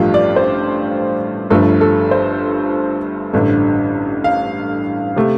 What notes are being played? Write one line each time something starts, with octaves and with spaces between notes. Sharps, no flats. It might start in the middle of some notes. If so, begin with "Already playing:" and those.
Already playing: A1 G2 F3 A3 F4 G4
D5
C5
G1 G2 F3 A3 A4
A4
C5
A1 G2 D3 A3
F5
C3 A3